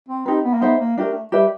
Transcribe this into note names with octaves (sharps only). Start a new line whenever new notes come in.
C4
C4 D#4 G4 B4
B3
A#3
B3 D#4 G#4 C5 E5
A#3
A3 D4 G4 A#4
G3 G4 B4 E5